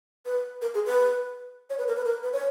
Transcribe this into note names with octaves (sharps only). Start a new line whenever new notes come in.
B4
A#4
G#4
B4
C#5
B4
A#4
B4
A#4
B4
C#5